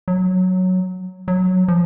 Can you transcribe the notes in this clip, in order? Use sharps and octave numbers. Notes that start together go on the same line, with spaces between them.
F#3
F#3
F3